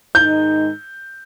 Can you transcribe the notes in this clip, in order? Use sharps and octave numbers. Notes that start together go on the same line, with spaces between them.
G#2 D#3 G#3 D#4 G6